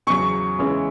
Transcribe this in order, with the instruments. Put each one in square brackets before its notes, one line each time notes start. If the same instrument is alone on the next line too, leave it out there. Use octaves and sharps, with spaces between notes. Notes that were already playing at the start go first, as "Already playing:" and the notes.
[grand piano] E2 C#3 F#3 [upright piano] C#6
[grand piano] E2 C#3 E3 G#3 C#4